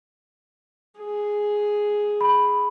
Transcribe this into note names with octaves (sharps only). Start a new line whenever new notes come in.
G#4
B5